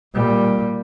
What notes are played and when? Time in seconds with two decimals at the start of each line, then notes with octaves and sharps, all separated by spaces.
0.13 A#2 G3